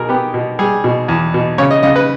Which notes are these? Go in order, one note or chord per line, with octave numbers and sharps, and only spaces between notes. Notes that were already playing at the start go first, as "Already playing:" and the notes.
Already playing: B2 G#4 A#4
B3 G4
B2
G3 G#4
B2
E2
B2
C#3 C#5
D#5
C#3 D#5
B4